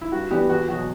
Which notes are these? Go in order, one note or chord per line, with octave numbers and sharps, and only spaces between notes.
E4
G2 F#4
E3 B3 D4 G4
E2 F#4
B2 F#3 F#4